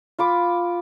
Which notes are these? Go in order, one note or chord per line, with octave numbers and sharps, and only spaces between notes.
F4 B5 D6